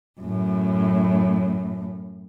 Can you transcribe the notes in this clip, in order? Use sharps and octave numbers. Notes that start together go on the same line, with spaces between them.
F#2 A2